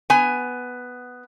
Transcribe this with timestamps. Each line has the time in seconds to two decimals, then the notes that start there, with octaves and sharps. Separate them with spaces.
0.10 B3 G#5